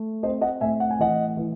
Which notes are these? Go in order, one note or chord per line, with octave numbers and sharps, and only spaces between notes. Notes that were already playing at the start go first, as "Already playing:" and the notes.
Already playing: A3
C4 C5 D#5
D#5 F#5
A2 E5 G#5
F#5
G#5
E3 D#5 F#5
E3